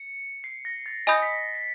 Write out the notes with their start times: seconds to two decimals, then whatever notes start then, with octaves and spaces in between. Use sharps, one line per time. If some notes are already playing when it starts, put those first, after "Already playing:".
Already playing: C#7
0.44 C7
0.65 A#6
0.86 A6
1.07 D#5 G#5 B5 D#6 G6 A#6
1.22 B6
1.38 C7
1.55 C7